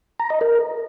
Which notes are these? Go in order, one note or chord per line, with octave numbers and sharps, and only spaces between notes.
A#5
D#5
A#4